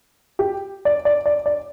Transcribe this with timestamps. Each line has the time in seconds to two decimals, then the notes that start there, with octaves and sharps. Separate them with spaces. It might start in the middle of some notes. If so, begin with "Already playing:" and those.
0.39 G4
0.85 D5
1.05 D5
1.26 D5
1.46 D5